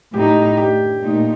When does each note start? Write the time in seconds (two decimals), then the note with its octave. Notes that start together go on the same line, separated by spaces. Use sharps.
0.13 A2 A3 D#4 G4
0.57 G4
1.02 A#2 A3 D#4